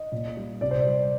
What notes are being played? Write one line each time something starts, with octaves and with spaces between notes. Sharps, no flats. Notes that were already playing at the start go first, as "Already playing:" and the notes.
Already playing: D#5
A#2
G3
C3 D5
C5
D5
G3